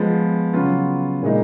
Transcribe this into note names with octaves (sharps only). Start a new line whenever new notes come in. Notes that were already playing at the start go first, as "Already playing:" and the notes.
Already playing: F3 G#3 B3
C#3 F#3 B3 F4
A#2 G#3 D#4